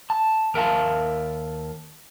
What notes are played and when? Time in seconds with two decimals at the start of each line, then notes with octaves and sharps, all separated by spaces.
0.10 A5
0.54 D#2 A#4 E5 F5 A5